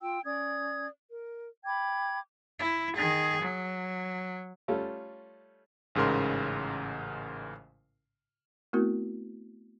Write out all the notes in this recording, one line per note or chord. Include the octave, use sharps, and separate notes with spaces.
F4 G5 E6
C#4 D5 D#6 G#6
A#4
G5 B5 D6 G#6
E4
D#3 G#4
F#3
G3 A3 C#4 F4 A4
A1 G#2 C#3 A#4 C6
A3 B3 C4 E4 F#4 A#4